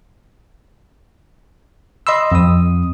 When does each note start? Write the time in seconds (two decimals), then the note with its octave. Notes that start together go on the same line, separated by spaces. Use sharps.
2.07 D#5 B5 C6 E6
2.32 F2 D#6